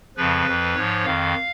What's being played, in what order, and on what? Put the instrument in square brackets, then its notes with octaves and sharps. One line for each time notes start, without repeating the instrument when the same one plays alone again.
[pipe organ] F2 C#3 F3 B4
F2 F3
G#2 F3 C#5
F2 D#3 F5